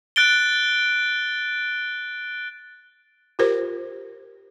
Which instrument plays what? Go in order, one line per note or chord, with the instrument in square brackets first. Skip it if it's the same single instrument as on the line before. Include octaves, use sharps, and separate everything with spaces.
[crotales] F#6 A6 D7 G7
[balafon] F4 G4 A#4 C5